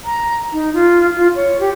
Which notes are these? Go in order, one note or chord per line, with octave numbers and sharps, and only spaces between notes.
A#5
D#4
F4
F4
C#5
G4